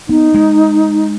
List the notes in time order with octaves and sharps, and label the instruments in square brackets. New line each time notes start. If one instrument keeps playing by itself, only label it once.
[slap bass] B3 [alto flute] D#4
[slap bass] G#3